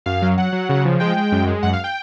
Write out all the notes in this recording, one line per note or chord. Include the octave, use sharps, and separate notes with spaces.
F#2 F5
F#3
F#3 F#5
F#3
C#3
F3
G#3 G5
G#3
F#2
G#3
F#2 F#5
F5
G5